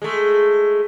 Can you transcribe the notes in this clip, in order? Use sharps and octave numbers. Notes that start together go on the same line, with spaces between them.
G#3 A3